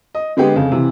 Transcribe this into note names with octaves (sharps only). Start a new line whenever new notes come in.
D#5
D3 G#3 B3 G4 G#4
F2 C#3
C3 E3